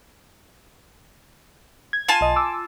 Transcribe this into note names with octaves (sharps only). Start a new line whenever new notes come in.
G#6
F4 G#5 A5
B1 D#5
D6 E6